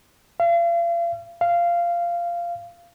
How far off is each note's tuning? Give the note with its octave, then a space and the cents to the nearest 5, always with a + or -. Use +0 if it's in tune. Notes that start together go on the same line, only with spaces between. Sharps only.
F5 -40
F5 -15